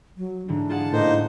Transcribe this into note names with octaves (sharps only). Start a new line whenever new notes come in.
F#3
G#2 D3 E3 D4
F4 G#4 F#5 A5
A2 A#3 D#4 C5